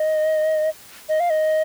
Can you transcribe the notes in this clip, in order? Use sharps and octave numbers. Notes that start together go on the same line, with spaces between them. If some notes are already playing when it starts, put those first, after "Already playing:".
Already playing: D#5
D#5
F5
D#5